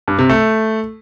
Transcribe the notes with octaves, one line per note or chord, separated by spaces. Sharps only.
G2
C3
A3